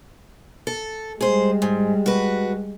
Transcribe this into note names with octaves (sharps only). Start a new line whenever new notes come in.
A4
G3 G#3 G#4 C5
G#2
F#4 B4